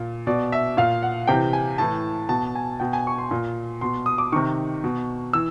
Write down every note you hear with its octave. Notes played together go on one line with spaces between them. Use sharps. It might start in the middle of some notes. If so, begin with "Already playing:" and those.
Already playing: A#2
B2 D5
E5
A#2 F5
F#5
C3 E3 G5
G#5
A2 E3 A5
B2 A5
G#5
B2 G5
G#5
C#6
C6
A#2
B2 C6
D#6
D6
C3 D#3 C#6
B2
E3 E6